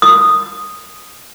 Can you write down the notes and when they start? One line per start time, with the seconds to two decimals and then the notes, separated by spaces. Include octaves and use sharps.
0.02 D#6